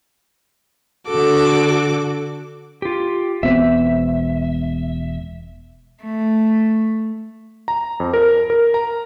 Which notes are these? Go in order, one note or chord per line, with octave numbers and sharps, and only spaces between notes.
D3 F#4 A4 D6
F4 G4
E1 B3 C4 E5
A3
A#5
F2
A#4
A#4
A#5